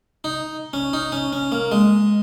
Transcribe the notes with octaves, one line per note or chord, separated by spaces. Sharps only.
D#4
C#4
D#4
C#4
C#4
A#3
G#3